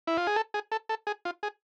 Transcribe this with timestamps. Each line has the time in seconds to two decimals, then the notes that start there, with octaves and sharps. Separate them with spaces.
0.07 E4
0.17 F4
0.27 G#4
0.36 A4
0.54 G#4
0.72 A4
0.89 A4
1.07 G#4
1.25 F4
1.43 G#4